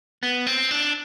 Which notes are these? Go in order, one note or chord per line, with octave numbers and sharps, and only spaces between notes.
B3
C4
D4